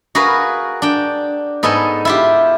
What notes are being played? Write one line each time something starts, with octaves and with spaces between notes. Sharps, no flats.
F#4 G#4 A#4 B4 F5
D4 G5
G#2 B3 D#4 A4 G#5
E4 F4 G4